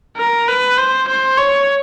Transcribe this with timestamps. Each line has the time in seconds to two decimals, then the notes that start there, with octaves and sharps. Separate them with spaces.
0.17 A#4
0.48 B4
0.78 C5
1.08 C5
1.38 C#5